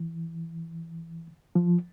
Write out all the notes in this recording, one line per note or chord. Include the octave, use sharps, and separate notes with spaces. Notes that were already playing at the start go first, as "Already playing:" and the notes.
Already playing: E3
F3